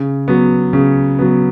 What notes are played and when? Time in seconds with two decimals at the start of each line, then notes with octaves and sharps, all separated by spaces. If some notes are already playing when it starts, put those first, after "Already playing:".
Already playing: C#3
0.28 F#3 B3
0.73 C#3
1.19 F#3 B3